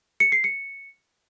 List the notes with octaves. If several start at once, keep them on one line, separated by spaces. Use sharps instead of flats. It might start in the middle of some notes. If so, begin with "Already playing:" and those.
C#7
C7
C#7